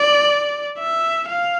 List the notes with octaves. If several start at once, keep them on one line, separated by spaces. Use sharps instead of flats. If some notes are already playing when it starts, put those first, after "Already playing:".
Already playing: D5
E5
F5